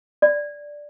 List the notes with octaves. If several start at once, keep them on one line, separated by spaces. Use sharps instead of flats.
D5